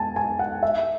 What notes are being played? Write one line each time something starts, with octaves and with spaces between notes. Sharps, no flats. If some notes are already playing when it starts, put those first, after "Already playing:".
Already playing: G#5 A5
G#5
F#5
E5